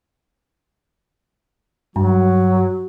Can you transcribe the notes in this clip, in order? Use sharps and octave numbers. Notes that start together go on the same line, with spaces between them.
G2 F#3 F#4